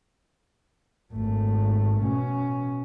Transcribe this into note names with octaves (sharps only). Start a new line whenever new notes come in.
G#1 A3
B2 C#4